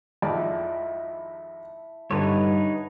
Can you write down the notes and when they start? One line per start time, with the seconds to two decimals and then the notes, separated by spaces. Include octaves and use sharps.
0.22 G#1 F2 E4 A4 D5
2.11 G2 D3 D#4 B4 C#5 F#5 G#5 A5